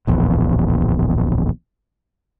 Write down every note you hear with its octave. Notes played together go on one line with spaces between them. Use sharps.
D1 A#1 E2